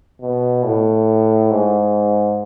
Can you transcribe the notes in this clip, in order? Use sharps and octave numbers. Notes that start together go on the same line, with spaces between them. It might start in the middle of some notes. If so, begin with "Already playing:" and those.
B2
A2
G#2